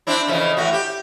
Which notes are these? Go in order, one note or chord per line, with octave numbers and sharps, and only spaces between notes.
C4 D4 E4
F2 C#3 E3
A2 E3 F#4
G4